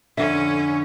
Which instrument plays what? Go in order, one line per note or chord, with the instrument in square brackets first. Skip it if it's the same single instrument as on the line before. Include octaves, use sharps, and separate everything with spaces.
[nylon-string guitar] F2 D3 [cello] C#4 [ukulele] E5